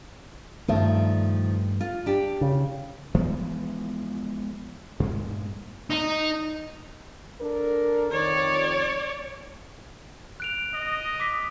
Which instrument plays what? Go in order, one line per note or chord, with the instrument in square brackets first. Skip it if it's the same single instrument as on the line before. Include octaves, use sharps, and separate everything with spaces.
[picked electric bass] G2 A3 [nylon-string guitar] D#3 F3
[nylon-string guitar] F4
D4 G4
[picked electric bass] C#3
[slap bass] E3 F3 G#3 B3
G2 A#2 G#3
[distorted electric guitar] D#4
[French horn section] D4 A4 A#4
[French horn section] F2 D#3 [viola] C#5 D5
[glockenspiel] F#6 D7 F7
[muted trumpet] D#5
[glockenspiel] D6 B6